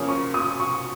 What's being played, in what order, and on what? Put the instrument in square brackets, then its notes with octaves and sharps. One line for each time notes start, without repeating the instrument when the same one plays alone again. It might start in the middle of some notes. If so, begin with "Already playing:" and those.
Already playing: [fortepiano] C#3 F3 A#3 C#4 [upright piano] D#6
[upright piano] C#6
D#6
C#6